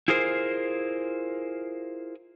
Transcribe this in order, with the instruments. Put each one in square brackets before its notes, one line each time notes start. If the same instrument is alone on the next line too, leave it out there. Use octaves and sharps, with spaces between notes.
[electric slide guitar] E4 F4 G#4 A#4 C5